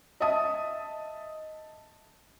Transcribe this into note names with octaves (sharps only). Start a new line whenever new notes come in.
D#5 E5 A5 D#6